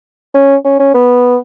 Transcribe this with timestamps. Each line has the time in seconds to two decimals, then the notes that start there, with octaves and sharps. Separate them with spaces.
0.34 C#4
0.65 C#4
0.79 C#4
0.94 B3